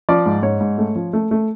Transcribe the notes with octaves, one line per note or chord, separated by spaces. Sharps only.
F3 D5
G#2
G#2 C#5
G#2
A3
F3
A3
A3